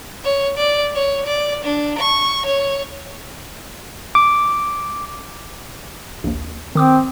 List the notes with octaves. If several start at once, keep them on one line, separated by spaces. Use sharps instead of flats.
C#5
D5
C#5
D5
D4
C#6
C#5
D6
A#1 D#2
D#3 C4 D6 D#6